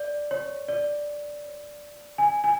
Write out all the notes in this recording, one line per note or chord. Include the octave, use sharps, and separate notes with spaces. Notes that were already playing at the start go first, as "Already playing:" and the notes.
Already playing: D5
C#5
D5
G#5
G#5